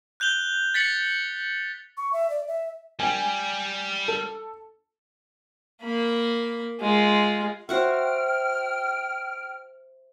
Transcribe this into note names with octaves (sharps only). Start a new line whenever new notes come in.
F#6 G6 F7 G7
A6 B6 C#7 F#7
C#6
E5
D5
E5
G3 G5 G#5
A4
A#3 B5
G#3 F4
F#4 C5 E5 F#5 G5 C#6 F6